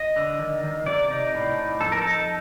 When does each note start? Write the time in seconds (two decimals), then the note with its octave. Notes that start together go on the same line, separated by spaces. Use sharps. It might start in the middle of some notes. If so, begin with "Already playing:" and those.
Already playing: D#5
0.16 D3
0.39 D#3
0.64 D#3
0.86 C3 D5
1.11 D#4
1.34 A2
1.57 D#4
1.80 F2 A4
1.92 A#4
2.02 D#4 A4